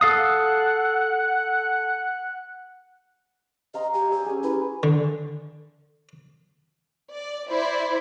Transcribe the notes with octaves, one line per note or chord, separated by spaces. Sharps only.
A4 F5 F#5 D#6
D#5 F5 A#5 C6
G4 G#5
G4 E6
C#4 G#4
E4 G4 B4
D3
D5
E4 C5 D5